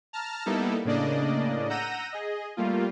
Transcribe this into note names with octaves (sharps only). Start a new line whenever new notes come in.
A5 A#5 F6
G3 A#3 B3 D#4 E4 A4
A2 C#3 A#3 D4 D5 D#5
F#5 A#5 E6 G6 A#6 D#7
G#4 D#5
G3 A3 A#3 F4